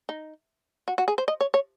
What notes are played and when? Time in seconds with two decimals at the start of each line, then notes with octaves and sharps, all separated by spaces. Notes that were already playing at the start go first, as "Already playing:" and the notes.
0.09 D#4
0.88 F#4
0.98 F#4
1.08 G#4
1.18 C5
1.28 D#5
1.41 C#5
1.54 C#5